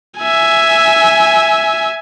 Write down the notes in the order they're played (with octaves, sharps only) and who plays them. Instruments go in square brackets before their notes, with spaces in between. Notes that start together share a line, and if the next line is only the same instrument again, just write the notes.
[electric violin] E5 G#5